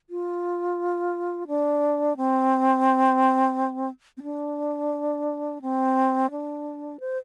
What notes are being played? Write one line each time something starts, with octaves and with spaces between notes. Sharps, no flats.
F4
D4
C4
C4
D4
C4
D4
C5